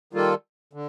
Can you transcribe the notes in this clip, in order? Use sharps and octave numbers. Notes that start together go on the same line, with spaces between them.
D#3 G3 A#3 F4 A4
D3